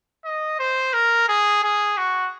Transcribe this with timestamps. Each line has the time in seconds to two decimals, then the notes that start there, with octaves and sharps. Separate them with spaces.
0.25 D#5
0.59 C5
0.93 A#4
1.28 G#4
1.63 G#4
1.98 F#4